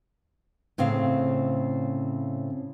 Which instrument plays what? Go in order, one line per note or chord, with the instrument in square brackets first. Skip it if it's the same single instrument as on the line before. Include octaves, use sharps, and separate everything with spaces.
[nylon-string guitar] A2 C#3 C4 F5